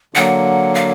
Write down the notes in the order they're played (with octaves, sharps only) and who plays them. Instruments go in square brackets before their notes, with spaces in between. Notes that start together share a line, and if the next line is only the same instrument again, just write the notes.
[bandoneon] D3 F#3 A#3 [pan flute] F#5
[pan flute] F5